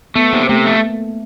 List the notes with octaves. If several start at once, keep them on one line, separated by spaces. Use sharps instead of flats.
A3 B3
C3 A#3
C3 A3
A3